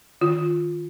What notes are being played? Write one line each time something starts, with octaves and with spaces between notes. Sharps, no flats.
D#3 F4